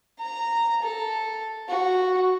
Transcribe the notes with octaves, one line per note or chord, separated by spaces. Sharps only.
A#5
A4
F#4